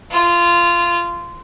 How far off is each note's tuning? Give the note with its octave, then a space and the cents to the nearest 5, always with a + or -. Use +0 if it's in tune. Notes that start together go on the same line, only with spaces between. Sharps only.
F4 -15